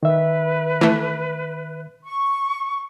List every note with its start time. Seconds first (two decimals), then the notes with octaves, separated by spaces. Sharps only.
0.03 D#3 B4 E5
0.81 E3 A3
2.04 C#6